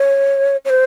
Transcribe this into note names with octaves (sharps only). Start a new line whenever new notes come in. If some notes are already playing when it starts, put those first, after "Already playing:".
Already playing: C#5
C#5
C5